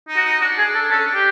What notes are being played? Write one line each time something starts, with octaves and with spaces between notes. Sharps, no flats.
D#4
F#4
D#4
D4 F#4
G#4
A4
C#4 A4
D4
G4